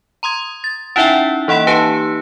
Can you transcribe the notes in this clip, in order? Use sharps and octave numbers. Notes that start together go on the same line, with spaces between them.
A#5 C6 D#6 G#6
A6
C#4 D#4 E4 E5 F#5 G5
E3 A#3 F#5 B5
D#4 G4 B4 A5 C#7